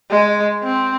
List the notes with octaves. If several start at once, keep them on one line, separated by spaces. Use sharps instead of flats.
G#3
C4